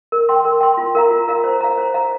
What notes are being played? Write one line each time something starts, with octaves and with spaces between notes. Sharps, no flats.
A#4
G5 C6
A#4
G5 C6
F4
A#4 F5 A#5
F4
A#4 F5 A#5
C5
F5 A#5
C5
F5 A#5